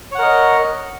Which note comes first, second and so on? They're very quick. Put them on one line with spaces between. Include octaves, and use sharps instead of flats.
C#5 F#5 A#4 D#5